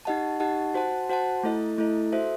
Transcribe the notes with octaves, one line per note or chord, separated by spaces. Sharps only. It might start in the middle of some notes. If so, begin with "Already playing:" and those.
D#4 G4 D#5 F#5 A5
D#4 G4 D#5 F#5 A5
F#4 C5 F#5 A5
F#4 C5 F#5 A5
A3 E4 A4 D#5
A3 E4 A4 D#5
F#4 A4 C5 E5